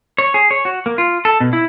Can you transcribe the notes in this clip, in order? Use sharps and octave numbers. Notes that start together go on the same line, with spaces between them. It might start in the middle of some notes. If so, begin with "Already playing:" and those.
C#5
G#4
C#5
F#4
A#3
F4
A4
B2
E4